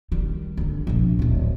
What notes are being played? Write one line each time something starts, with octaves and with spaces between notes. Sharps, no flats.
D#3 G3
D3 G3
A#1 C3
D1 C4